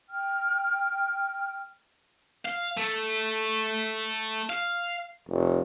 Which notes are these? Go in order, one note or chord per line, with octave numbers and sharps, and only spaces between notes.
G5 F6
F5
A3
F5
F1